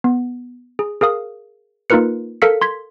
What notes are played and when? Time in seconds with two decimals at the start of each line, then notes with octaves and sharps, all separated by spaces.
0.04 B3
0.79 G#4
1.01 G#4 A#4 F5 D#6
1.90 A#3 D#4 F4 A#4 B4 C#7
2.42 A4 A#4 F5 E6 B6 C#7
2.61 C6 G#6 B6